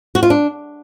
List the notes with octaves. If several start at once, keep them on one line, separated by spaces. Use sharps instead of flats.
F#4
F4
D4